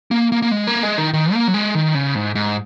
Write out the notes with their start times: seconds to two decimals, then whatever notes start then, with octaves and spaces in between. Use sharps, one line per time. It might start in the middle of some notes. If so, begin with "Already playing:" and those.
0.11 A#3
0.32 A#3
0.42 A#3
0.51 G#3
0.67 A#3
0.83 G#3
0.98 D#3
1.13 D#3
1.33 A#3
1.48 F#3
1.54 G#3
1.75 D#3
1.95 C#3
2.15 G#2
2.35 G#2